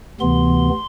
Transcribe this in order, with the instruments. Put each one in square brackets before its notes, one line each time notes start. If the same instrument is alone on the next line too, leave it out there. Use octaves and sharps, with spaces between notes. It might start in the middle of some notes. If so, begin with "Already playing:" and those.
[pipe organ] D2 C3 E3 B3 C6